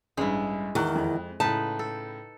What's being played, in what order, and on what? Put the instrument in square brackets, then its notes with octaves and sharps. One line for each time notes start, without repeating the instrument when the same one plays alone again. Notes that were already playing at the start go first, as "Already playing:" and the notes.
[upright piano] A1 G2 [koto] G#3 E4
[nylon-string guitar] E2 D#3 [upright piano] C#6 F#6
[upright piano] F2
[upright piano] A2 C#3 [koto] D#4 B4 [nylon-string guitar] A5
[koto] A4